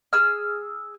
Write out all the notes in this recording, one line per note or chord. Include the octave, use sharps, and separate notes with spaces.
G#4 E6 F6